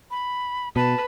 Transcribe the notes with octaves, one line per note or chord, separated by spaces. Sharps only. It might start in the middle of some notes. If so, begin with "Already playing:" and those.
B5
B2 B4 A5